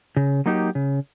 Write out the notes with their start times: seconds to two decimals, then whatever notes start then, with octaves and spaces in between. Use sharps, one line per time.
0.16 C#3
0.46 F#3 A#3 D#4 G4
0.75 C#3